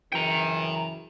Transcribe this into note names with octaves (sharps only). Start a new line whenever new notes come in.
F#2 C#3 E3 G5 A#5